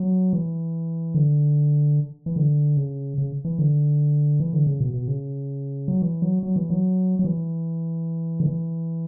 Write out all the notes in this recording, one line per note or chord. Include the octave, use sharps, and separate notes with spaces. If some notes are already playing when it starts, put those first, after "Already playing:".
Already playing: F#3
E3
D3
E3
D3
C#3
C#3
E3
D3
E3
D3
C#3
B2
B2
C#3
F#3
E3
F#3
F#3
E3
F#3
F#3
E3
D3
E3